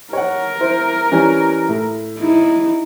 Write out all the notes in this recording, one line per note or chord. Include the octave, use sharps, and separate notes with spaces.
A#4 C#5 F#5
E4 C5
E3 G3 C#4
A2
D#4 E4